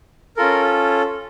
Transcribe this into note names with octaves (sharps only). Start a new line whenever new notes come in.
C#4 F4 A4 A#4